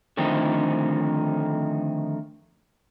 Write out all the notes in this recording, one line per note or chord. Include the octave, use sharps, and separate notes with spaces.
D3 D#3 F3 A3 C4 D#4